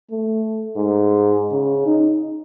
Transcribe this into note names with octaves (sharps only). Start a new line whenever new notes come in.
A3
G#2
C#3
D#4